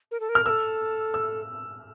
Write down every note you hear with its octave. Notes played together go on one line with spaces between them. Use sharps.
A#4
A4
A#4
F6
A4 A#4 E6
E6